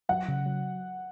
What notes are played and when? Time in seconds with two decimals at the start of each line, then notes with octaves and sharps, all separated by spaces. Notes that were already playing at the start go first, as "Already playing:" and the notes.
0.09 F#3 F#5
0.28 C#3
0.46 F#3